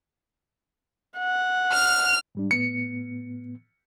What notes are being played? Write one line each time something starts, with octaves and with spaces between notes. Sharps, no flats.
F#5
F6 F7
G#2 G3 D4
A2 B3 C#7